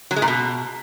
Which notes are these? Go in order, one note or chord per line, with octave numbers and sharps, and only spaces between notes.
F#3
G#3
A#2
B2